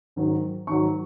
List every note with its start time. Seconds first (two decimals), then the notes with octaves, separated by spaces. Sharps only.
0.16 G#2 D#3 F#3
0.67 G#2 D#3 F#3 C#6